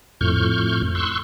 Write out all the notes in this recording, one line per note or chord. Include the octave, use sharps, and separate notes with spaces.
F2 A2 C#6 F6 G6
C6 C#6 E6 F#6